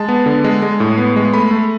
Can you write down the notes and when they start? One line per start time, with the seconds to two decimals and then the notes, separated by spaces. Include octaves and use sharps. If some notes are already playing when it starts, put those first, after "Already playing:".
Already playing: G#3 A5
0.09 B3
0.26 D3
0.44 G#3
0.62 G#3
0.80 A2
0.98 B3
1.16 G#3
1.34 A3 B5
1.51 A3